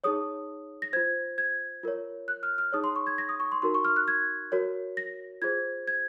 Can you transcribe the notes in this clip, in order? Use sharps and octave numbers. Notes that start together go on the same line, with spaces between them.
D#4 G#4 C#5 D#6
A#6
F4 C5 G#6
G#6
F4 A#4 C#5
F#6
F6
F6
D#4 G#4 C#5 D#6
C6
C#6
G#6
A#6
D#6
C#6
C6
D#4 F#4 A#4 C6
C#6
F6
F#6
G#6
F#4 A#4 C#5
A#6
F4 G#4 C5 G#6
G#6